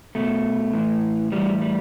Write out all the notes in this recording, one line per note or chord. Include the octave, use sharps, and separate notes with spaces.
B2 A3
A2 E3
A2 E3 G3
G3